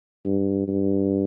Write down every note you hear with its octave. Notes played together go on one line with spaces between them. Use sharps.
G2
G2